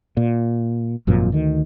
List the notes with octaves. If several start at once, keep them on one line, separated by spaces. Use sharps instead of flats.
A#2
G#1 F#2 A#2 F3
D2 D#3